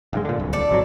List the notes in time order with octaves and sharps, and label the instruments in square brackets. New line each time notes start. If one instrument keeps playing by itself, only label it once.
[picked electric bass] F1 G2 G#3
A#2 D3
D1 C2
[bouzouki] A4 D5
[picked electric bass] G#1 F2 F#3